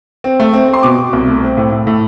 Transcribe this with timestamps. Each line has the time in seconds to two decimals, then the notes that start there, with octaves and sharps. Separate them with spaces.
0.24 C4
0.40 A3
0.53 C4
0.68 C4
0.73 C6
0.83 B2 D6
0.98 B2
1.13 C2
1.27 A3
1.43 C4
1.57 A2
1.72 A2
1.87 A2